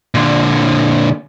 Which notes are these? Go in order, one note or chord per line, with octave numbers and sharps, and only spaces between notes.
A#2 D3